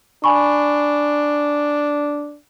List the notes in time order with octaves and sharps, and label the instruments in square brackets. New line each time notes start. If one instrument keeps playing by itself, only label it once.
[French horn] D4 [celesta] G#5 B5 C#6